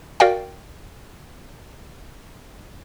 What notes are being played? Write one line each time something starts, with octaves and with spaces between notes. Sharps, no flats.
F#4 A#4 D5 F5 G5